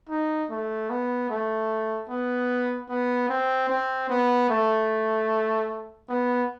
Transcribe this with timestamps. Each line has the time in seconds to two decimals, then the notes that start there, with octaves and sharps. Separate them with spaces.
0.09 D#4
0.50 A3
0.90 B3
1.30 A3
2.09 B3
2.89 B3
3.29 C4
3.70 C4
4.10 B3
4.50 A3
6.09 B3